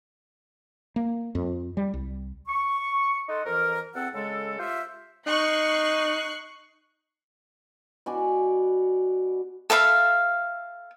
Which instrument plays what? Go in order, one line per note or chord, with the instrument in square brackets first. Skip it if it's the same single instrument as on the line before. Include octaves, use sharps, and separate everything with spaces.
[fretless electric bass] A#3
F2
G3
C2
[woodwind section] C#6
D#4 A4 D#5 F#5 C6
F2 E3 A#4
E2 C4 A4 F#5
C#3 G#3 A4
F4 G4 C5 E5
[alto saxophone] D#4 [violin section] C#6 F#6 C7
[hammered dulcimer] B2 F#4 D5 G#5
[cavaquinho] A4 E5 F5 B5